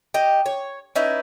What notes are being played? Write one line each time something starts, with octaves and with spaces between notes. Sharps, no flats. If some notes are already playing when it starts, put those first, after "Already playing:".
G4 D#5
C#5
C#4 D#4 E4 B4